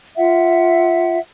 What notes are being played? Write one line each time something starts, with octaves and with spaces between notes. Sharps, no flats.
F4 E5 F#5